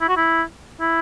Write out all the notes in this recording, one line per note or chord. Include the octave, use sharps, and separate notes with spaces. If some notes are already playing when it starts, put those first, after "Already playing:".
E4
F#4
E4
E4